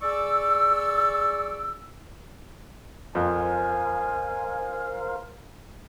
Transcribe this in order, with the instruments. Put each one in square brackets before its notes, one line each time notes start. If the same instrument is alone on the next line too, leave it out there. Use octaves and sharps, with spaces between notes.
[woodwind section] G#4 D5 C#6 E6
[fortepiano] F2 [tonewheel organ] A#4 C5 F5 [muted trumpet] G#5